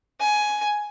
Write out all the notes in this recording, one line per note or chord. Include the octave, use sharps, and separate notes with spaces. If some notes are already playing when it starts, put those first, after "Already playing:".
G#5